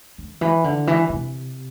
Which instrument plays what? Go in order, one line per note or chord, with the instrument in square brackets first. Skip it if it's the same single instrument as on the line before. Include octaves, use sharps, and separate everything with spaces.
[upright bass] D3
E3
D3
E3
C3